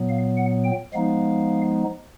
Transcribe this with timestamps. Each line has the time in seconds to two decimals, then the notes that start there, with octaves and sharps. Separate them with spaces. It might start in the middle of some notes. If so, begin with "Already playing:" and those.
Already playing: A#2 F#3 B3
0.09 F5
0.37 F#5
0.65 G5
0.93 F3 G#3 B3 D#4 F5